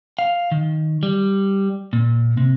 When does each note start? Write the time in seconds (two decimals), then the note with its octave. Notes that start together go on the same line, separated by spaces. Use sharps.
0.19 F5
0.51 D#3
1.03 G3
1.93 A#2
2.37 C3